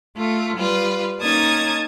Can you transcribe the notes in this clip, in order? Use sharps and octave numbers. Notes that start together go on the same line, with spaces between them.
A3 F4
G3 F4 B4
A#3 C#4 D#4 A5 D#6 G#6